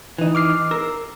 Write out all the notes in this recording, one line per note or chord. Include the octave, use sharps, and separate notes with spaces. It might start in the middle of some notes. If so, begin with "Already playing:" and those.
E3 D#4
D6 F6 C7
A#4 E6